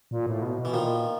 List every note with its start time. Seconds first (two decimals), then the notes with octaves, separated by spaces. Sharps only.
0.11 A#2
0.26 A2
0.42 B2
0.58 B2
0.65 E3
0.73 A#2 D#3 F3